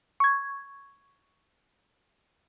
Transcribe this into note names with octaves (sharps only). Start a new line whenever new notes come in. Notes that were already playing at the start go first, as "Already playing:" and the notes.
C#6 G#6